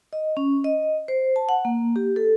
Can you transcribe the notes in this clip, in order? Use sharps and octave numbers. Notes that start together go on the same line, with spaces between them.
D#5
C#4
D#5
C5
A5
F#5
A#3
G4
A4